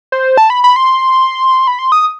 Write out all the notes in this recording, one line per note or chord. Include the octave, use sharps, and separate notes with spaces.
C5
A5
B5
B5
C6
B5
C6
D#6